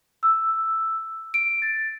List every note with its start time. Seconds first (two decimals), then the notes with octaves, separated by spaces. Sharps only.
0.23 E6
1.34 D7
1.62 A6